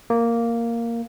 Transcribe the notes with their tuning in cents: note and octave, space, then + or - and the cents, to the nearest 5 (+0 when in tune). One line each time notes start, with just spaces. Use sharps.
A#3 -5